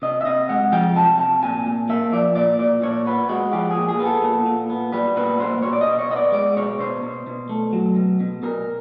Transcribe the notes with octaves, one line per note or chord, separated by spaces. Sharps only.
C3 D#5
E5
C3 D#5
G#3 F#5
F3 G5
C3 A5
C3 A5
A#2 G#5
A#2
A#3 E5
F3 D5
A#2 D5
A#2 D5
A#2 C#5
B3 B4
G#3 F#4
F3 G4
A#2 G#4
G#4
B3
A4
A#2
A#2
B3
G3 B4
A#2 B4
A#2 C5
B2 C#5
D5
D#5
B2
C#5
B3 D#5
D5
G#3 D5
B2 C#5
B2 C5
B2
B2
A3
F#3
B2
B2
B2 A#4